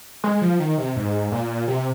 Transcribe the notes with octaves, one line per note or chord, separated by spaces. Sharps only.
G#3
F3
D#3
C3
G#2
A#2
C3